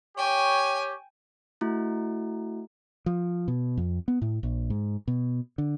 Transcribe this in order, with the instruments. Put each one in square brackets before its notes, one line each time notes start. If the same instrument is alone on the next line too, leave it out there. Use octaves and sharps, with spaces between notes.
[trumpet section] G4 C#5 [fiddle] G5 G#5
[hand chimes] A3 E4 F#4
[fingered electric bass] F3
B2
F2
B3
A2
A#1
G#2
B2
D3